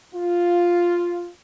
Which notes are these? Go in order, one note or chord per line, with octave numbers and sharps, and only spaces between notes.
F4